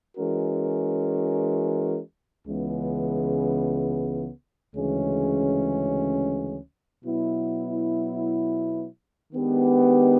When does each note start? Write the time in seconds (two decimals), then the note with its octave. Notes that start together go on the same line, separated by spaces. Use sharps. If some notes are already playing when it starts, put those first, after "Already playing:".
0.17 E3 G#3 C#4 F#4 A#4
2.46 C#2 C#3 E3 G#3 B3
4.75 D2 C#3 E3 G#3 C#4
7.04 B2 F#3 B3 E4
9.33 D#3 G#3 B3 D4 G4